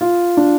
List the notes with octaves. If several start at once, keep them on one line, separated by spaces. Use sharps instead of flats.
F4
D4